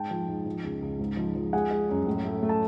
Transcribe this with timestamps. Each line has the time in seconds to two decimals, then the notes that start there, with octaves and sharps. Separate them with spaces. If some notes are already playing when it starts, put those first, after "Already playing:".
Already playing: G#2 G5 A5
0.11 F3
0.28 G#2
0.46 F3
0.64 C#2
0.81 C#2
0.99 G#2
1.17 F3
1.36 F3
1.53 G#3 F#5 G#5
1.71 G#3
1.90 F#2
2.07 A2
2.25 A3
2.43 A3
2.49 A5